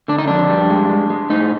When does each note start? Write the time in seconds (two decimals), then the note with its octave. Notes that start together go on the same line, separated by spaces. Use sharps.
0.08 D3 D4
0.19 D#4
0.28 F2 D4
0.49 G3
0.70 G#3
0.90 G#3
1.10 G#3
1.30 A2 D#4